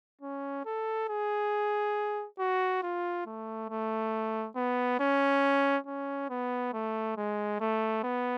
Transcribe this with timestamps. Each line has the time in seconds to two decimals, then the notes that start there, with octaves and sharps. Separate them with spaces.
0.21 C#4
0.65 A4
1.09 G#4
2.39 F#4
2.82 F4
3.26 A3
3.69 A3
4.56 B3
4.99 C#4
5.86 C#4
6.30 B3
6.73 A3
7.17 G#3
7.60 A3
8.04 B3